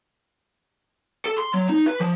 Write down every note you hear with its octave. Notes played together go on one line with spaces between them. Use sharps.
A4
C6
F#3
D#4
B4
F3